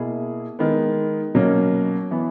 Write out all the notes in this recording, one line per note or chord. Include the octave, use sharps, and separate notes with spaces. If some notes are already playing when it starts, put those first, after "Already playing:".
Already playing: B2 A#3 E4 G#4
D#3 G#3 B3
B2 F#3 A#3 C#4
E3 B3